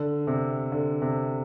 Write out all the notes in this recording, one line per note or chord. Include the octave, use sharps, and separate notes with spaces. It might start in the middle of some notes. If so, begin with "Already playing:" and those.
Already playing: D3
C3
D3
C3